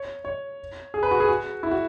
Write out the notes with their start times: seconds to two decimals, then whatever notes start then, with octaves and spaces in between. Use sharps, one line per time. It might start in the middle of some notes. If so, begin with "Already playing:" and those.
Already playing: C#5
0.25 C#5
0.94 G#4
1.03 B4
1.11 F#4
1.20 G#4
1.29 F#4
1.63 E4
1.71 F#4